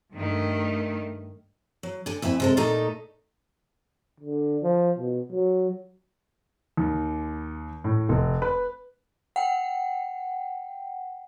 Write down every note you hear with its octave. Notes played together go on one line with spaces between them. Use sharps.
G2 D#3 A3
F#3
D3 G#5
F2 E4 E5 G#5
C3 G#3 A4
A#2 A3 D#4 A4 A#5
D3
F3
B2
F#3
D#2
A2
F1
B4
F#5 G5